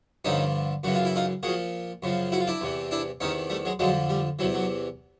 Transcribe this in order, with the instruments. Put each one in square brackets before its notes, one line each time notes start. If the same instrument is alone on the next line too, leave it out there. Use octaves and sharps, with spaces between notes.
[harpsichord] G2 D3 F3 C#4 D#4
F#2 C#3 E3 F#4
F4
E4
D#4 F4
A#2 F#4 G#4
F3
F#2 C#3 F3
E4 F#4
F4
D4 E4
E2 C3 E3
D4 E4
E2 C3 D#3 C#4 D#4
G3 A3
F#3 G#3
F2 D3 F3 F#3 G#3
G3
E2 C3 E3 F#3
F#3